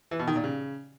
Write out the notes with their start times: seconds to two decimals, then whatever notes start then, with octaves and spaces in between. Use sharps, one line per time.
0.11 E3
0.19 B2
0.28 D#3
0.36 A#2
0.44 C#3